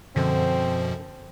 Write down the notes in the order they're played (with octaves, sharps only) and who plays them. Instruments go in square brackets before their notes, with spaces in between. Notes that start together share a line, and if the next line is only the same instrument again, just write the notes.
[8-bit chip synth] F#2 B2 F3 [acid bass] D3 [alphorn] C4